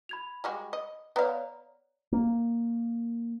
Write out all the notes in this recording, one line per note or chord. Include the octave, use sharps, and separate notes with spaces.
B5 G#6 F7
G3 G#3 F#4
D#5
B3 C#5 D5 F5 A#5
A#3